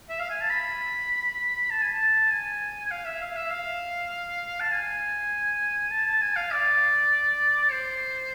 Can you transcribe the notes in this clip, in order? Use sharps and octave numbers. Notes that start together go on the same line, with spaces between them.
E5
F5
G#5
A5
B5
A5
G#5
A5
G#5
G#5
F5
E5
F5
E5
F5
A5
G#5
A5
A5
G#5
F5
D5
D5
C5